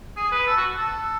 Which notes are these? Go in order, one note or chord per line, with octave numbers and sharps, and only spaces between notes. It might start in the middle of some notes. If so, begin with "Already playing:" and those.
G#4
B4
A4
F#4
A4